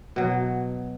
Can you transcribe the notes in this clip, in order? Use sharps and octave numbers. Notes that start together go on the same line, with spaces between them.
B2 F#3